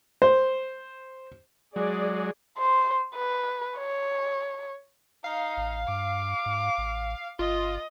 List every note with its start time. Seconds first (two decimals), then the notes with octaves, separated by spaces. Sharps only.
0.22 C5
1.76 F#3 G#3 G#4 D5
2.58 C5
3.15 B4
3.78 C#5
5.24 D#4 F5
5.57 A1
5.88 G2 D6
6.46 G#2
6.78 A1
7.39 G1 F4 D#5